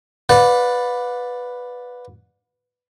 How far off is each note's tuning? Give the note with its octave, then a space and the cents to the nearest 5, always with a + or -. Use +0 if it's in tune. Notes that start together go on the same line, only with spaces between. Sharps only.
B4 +0 D5 +0 F#5 -45